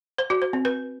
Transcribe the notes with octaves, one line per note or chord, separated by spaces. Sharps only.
C5
F#4
C5
C4
B4